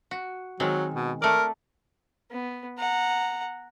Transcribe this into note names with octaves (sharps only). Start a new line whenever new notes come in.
F#4
D#3 F#3 G#3 C4
B2
A3 A#4 D5
B3
F#5 A#5